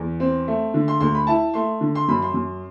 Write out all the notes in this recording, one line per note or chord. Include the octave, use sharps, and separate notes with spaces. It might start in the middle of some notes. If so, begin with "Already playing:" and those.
Already playing: E2
C4
A3
D3
C6
D2 C6
B5
E4 A5
A3 C6
D3
C6
F#2 B5
C6
F#2